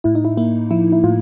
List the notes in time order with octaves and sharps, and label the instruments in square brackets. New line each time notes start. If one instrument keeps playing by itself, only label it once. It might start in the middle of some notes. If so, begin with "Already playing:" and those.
[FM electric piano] A2 E4
D#4
E4
A#3 E4
F3 E4
E4
A2 F4